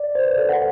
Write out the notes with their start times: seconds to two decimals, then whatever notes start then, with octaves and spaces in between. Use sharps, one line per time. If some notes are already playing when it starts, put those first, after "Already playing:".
Already playing: D5
0.15 C5
0.27 B4
0.38 A4
0.49 F#5